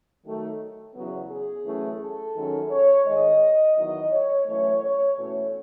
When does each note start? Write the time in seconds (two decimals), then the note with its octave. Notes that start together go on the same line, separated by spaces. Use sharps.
0.24 D#3 F#3 A3 D#4
0.95 E2 C#3 F#3 B3
1.31 G#4
1.65 F#2 E3 A3 C#4
2.00 A4
2.35 F#2 D#3 G#3 C#4
2.70 C#5
3.06 G#2 D#3 G#3 D#5
3.76 E2 D#3 F#3 D#5
4.10 C#5
4.46 F#2 E3 A3 C#5
4.81 C#5
5.16 E2 B2 A3 C#4 C#5